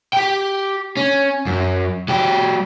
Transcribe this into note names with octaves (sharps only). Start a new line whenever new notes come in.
G4 G5
C#4
F#2
F#3 G4